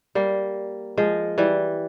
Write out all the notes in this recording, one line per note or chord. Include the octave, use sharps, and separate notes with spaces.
G3 A#3
F3 G#3
E3 G3